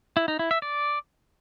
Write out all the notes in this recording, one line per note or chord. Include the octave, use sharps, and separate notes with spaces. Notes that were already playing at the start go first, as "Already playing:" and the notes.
E4
D#4
E4
E5
D5